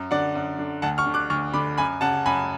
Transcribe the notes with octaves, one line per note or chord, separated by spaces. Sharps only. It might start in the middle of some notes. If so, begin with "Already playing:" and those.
Already playing: F#2
D3 D5 F#5
F#2
D3
D2 F#5 A5
C#6 F6
D3
D6 F#6
D2 C#6 F6
D3 B5 D6
F#2 G#5 B5
C#3 F#5 A5
F#2 G#5 B5